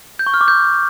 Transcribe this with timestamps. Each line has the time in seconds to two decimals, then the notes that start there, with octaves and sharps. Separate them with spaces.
0.19 G6
0.27 C#6
0.34 F6
0.41 D6
0.48 G6